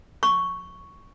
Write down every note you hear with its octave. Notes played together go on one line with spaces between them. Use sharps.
C#6